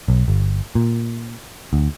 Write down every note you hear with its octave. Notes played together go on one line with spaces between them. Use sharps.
B1
G1
A#2
D2